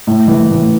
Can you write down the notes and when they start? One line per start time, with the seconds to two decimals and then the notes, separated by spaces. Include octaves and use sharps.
0.07 A2
0.28 E3
0.50 A2